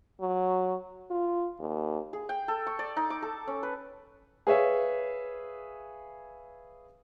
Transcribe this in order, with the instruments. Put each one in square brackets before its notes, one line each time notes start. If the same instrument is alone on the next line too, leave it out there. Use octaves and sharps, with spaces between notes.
[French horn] F#3
F4
D#2
[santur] G#4
G5
A4
C#6
D5
D#4
D6
A4
C#4
B4
[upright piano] G#4 B4 C#5 E5 F5